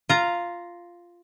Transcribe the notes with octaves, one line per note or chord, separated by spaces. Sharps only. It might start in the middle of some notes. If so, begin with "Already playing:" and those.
F4 A#5